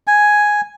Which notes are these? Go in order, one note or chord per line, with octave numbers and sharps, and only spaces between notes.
G#5